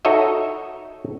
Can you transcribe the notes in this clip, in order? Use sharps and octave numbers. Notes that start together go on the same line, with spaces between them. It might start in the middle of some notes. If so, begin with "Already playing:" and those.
D#4 F#4 A4 C#5 D#5 E5